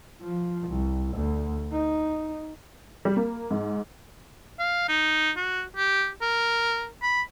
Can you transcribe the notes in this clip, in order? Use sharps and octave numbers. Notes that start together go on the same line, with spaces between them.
F3
C2
D2
D#4
G3
A#3
G#2
F5
D#4
F#4
G4
A#4
B5